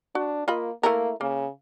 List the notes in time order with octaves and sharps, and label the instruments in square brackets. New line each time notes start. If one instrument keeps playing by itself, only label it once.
[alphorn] D4 [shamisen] F#4
[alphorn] A#3 [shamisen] F4 D#5 B5
[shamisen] A3 E4 A#4 [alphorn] A#3
[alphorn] C#3 [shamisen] A#3